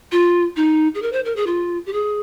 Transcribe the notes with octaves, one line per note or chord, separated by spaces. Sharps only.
F4
D#4
G#4
A#4
C5
A#4
G#4
F4
G4
G#4